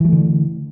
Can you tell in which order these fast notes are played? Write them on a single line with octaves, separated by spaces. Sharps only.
E3 F#3 A3 D3